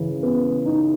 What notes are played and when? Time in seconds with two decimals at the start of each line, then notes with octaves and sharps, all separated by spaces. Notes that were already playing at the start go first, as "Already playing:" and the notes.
Already playing: C#3 E3
0.23 B3
0.66 D#4